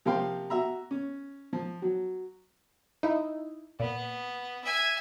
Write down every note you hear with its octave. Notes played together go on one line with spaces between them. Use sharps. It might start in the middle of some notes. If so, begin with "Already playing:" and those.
C3 F3 A#3 F5 G5 C6
F#4 E5 A#5
C#4
F3
F#3
D#4 E4
A#2 B3
E5 G#5